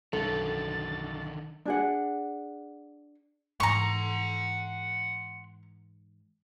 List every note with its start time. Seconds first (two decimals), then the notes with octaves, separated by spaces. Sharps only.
0.13 B1 F#2 D3 D#3 A4 A6
1.65 D4 G#4 F#5
3.60 G#2 E3 F#5 A#5 C6 C#6